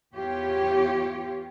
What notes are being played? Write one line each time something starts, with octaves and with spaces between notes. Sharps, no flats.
E2 F4 G4 C#5